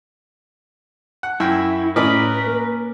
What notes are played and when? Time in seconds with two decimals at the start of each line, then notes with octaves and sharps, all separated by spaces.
1.23 F#5
1.40 F#2 E4 G5
1.96 A2 C#4 A#4 B4 D5 D#5
2.47 A#3